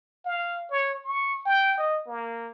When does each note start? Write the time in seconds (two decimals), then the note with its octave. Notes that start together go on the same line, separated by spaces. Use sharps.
0.25 F5
0.71 C#5
1.05 C#6
1.45 G5
1.78 D#5
2.06 A#3